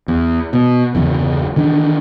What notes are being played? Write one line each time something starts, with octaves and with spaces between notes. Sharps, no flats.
E2
B2
G1 E2 C#3 E3
D#3 E3 D4